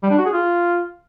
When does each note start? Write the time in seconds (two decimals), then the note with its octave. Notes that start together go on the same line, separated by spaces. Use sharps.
0.03 G3
0.10 D4
0.18 F#4
0.26 G#4
0.33 F4